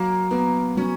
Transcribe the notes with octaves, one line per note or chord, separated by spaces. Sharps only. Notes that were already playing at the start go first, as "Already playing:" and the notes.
Already playing: F#3 A#3
A#3 B3
F#3 C#4